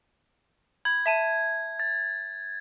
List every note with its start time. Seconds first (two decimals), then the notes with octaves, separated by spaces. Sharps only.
0.85 B5 G#6
1.06 E5 A5 D#7
1.80 A6